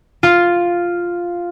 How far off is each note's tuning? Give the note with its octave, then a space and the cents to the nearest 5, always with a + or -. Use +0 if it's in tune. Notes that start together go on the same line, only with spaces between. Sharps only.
F4 +0